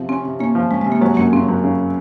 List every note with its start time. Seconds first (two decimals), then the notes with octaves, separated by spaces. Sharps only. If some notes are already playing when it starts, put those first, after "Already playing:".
Already playing: C3 F3
0.09 C4 C#4
0.25 C3
0.39 A#3 C#4
0.55 F3
0.71 G#3 C#4
0.81 G#3
0.86 C3
0.92 A#3
1.01 F#3 G#3
1.17 F#2 A#3
1.33 C#3 C4
1.49 F#2
1.64 C#3